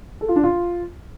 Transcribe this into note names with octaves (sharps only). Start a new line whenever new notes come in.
A4
F4
D4
F4